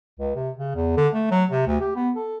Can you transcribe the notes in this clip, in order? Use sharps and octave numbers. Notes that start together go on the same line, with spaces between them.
C#2
C3
C#3
E2
D3
A3
F#3
C3
D2
G4
B3
A4